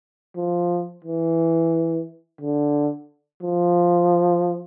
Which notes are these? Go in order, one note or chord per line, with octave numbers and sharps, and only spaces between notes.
F3
E3
D3
F3